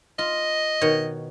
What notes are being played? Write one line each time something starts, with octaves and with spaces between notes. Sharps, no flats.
F4 D#5
B2 D#3 C#5